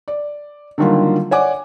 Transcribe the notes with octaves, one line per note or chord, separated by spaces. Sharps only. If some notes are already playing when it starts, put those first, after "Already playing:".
D5
D3 D#3 F#3 G3 A#3 F4
C#5 D5 F#5 G#5 D6